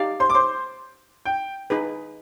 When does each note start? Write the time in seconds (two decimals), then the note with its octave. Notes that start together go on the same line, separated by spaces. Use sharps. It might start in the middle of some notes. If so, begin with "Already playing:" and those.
Already playing: D#4 G4 D5 F5
0.20 C5 C6
0.30 D6
0.35 C5 C6
1.25 G5
1.70 D#4 G#4 B4